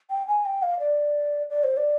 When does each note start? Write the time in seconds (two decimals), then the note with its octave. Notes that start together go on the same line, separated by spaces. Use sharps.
0.10 G5
0.28 G#5
0.46 G5
0.63 F5
0.80 D5
1.50 D5
1.64 C5
1.77 D5